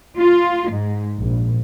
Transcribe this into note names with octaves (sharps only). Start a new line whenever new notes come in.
F4
G#2
A#1